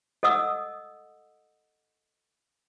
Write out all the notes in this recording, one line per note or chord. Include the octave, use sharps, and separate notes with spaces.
A4 D#5 F#5 D#6 E6